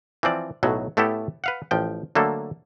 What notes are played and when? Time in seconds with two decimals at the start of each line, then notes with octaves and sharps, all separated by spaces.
0.23 E3 F3 C4 D5
0.63 B1 A2 F#3
0.97 A2 A3 B3 E4 G4 A4
1.44 B4 F5 F#5
1.71 A1 F3 G5
2.15 D3 F#3 A3 A#3 A4